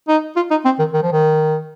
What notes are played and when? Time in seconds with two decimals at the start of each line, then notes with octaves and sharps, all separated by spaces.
0.08 D#4
0.36 F4
0.51 D#4
0.65 C4
0.79 D#3
0.93 D#3
1.03 F3
1.12 D#3